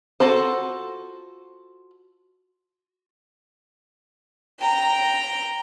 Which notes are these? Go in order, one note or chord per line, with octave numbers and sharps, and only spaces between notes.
F4 F#4 A4 C5
G5 A#5